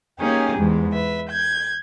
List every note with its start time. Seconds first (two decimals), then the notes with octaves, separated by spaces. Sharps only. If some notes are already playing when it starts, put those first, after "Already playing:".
0.19 A#3 C#4 D#4 G4 G#4
0.57 E2 G#2 G#3
0.93 B4 E5
1.29 G6 G#6